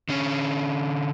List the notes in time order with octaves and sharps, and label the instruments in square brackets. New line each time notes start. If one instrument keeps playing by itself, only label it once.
[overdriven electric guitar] D3 C#4